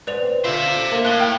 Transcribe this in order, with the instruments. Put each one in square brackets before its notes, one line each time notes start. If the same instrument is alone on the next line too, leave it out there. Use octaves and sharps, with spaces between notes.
[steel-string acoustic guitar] G#2 [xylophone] B4 D5 F7
[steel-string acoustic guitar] C4
[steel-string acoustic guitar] D3 F4 [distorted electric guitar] C5 E5
[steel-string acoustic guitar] A#3
[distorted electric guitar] A2 [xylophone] F#6 G7
[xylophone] G5